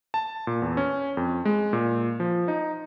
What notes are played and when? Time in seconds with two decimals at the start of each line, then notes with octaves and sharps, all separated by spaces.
0.14 A5
0.47 A#2
0.62 E2
0.77 C#4
1.17 F2
1.45 G#3
1.73 A#2
2.20 F3
2.48 D#4